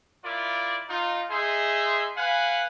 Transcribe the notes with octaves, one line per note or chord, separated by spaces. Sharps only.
E4 F4 A#4 D5
D#4 F4
D#4 G#4 E5 C6
B4 F5 F#5 G#5